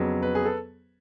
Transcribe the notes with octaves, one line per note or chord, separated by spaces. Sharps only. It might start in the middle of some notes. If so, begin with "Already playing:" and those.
Already playing: F2 C#3 F#3 B3
B4
G#4
A4